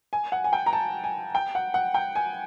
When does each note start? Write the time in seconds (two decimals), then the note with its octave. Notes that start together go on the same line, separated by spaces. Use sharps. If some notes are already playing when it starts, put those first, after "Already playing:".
0.13 G#5
0.32 F#5
0.44 G#5
0.53 G5
0.66 A#5
0.73 A5
1.04 G#5
1.35 G5
1.55 F#5
1.74 F#5
1.94 G5
2.15 G#5